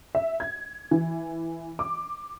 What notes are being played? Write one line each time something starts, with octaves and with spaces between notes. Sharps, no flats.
E5
G#6
E3
D6